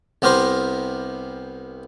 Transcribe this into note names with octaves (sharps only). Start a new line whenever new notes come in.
C2 B3 G4 A#4 C5